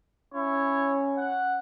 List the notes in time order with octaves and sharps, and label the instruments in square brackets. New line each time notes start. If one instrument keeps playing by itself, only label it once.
[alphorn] C#4 [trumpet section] E4 C#5
[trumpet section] F#5